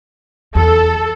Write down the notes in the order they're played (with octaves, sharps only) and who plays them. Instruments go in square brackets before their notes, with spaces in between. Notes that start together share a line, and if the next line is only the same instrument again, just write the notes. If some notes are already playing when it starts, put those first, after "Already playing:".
[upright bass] E2 [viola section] A4